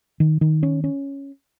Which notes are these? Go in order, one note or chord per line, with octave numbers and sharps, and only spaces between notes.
D#3
D#3
C#4
C#4